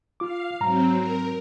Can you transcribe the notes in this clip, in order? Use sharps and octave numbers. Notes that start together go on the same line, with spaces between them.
F4 F5 D6
G#2 F#3 C4 A#5
A#4